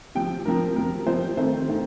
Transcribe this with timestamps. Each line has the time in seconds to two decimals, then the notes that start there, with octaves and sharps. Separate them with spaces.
0.15 C3 F3 C4 G5
0.45 C3 F3 C4 A#4
0.76 C3 F3 C4 A#4
1.07 C3 F3 C4 C5
1.37 C3 D#3 A3 C4 C5
1.68 C3 D#3 A3 C4